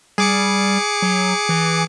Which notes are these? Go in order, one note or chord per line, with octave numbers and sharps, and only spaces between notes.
G3 G#4 D6 C#7
F#3
E3